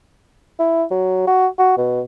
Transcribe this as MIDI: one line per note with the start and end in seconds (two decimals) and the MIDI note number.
0.59 0.84 64
0.91 1.24 54
1.27 1.47 66
1.59 1.76 66
1.78 2.01 47